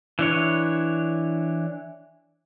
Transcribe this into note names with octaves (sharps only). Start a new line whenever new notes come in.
E3 D4 C#5